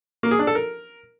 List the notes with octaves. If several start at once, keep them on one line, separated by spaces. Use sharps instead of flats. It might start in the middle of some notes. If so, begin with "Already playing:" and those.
A#3
G#4
D4
A4
A#4